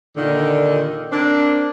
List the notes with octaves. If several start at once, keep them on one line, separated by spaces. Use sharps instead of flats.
D#2 A#2 D3 D#3
A#3 C4 D4